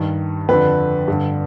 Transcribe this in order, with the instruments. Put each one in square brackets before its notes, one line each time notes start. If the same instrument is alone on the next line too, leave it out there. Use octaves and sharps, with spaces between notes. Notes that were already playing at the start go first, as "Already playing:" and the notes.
Already playing: [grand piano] G2 D#3
F2 D3 B4
G2 D3